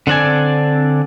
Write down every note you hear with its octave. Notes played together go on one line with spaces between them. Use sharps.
D3 C4 D4 D5 G#5